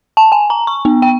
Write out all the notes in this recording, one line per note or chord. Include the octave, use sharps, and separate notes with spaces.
A5
G#5
A#5
C#6
B3
G5